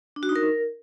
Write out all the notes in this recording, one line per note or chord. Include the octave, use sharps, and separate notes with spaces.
D4
F#4
D#4
A#4